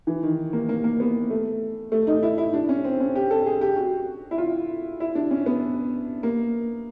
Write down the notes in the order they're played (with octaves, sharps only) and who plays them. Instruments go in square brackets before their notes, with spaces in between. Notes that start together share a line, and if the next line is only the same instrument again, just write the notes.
[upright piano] E3
D#3
A#3
A#3
A#3
B3
A3
A3
D#4
E4
E4
D4
C#4
C4
C#4
G4
A4
G#4
G4
F#4
E4
F4
E4
D4
C#4
B3
A#3